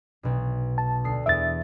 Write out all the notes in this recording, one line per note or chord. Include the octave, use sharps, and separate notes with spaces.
B1 B2
A5
D2 D#6 C7
E2 E5 D#6 A6 D7